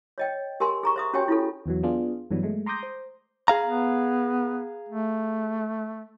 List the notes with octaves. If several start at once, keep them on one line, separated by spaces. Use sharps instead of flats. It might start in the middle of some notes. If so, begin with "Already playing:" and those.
C#5 D#5 G5
G4 A#4 G#5 C6
G#4 A#5 C#6
C5 E5 D#6
C#4 F#4 G4 C#5 G5 G#5
E4 F4 A4
E2 E3 F#3
B3 D4 F4 G#4
G2 E3 F#3 G3 B3
G#3 A3
A#5 C6 D6 D#6 G6 A#6
C5
G#4 F5 A#5
B3
A3